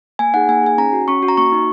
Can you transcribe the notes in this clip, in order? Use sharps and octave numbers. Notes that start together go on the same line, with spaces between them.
A#3 G#5
D#4 G#4 F#5
A#3 G#5
D#4 G#4 G#5
C#4 A#5
F#4
C#4 C#6
F#4
A#5
A#3 C#6
D#4 F#4